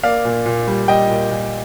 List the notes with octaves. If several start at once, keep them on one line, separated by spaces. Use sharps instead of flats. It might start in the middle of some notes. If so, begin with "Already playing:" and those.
A#3 D5 F5
A#2
A#2
G3
G3 D#5 G5
A#2
A#2